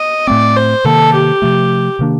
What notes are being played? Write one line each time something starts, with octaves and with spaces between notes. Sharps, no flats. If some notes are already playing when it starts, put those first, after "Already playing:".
Already playing: D#5
A2 A3 C4 D5
C5
C3 D#3 A#3 A4
G4
C3 F3 A3
C3 D#3 A#3 D4